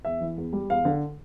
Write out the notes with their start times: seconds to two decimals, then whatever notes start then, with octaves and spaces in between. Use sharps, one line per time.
0.05 E2 E5
0.21 E3
0.37 E2
0.53 G3
0.70 E2 F5
0.85 D3